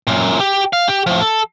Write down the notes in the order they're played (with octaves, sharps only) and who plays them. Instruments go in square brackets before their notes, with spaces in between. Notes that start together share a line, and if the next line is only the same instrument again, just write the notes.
[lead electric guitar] F#2 A#2
G4
F5
G4
A2 F3
A4